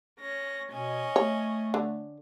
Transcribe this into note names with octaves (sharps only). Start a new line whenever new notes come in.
C#4 A#6
B2 C#4 D#5 G#5
A3 C#5
D3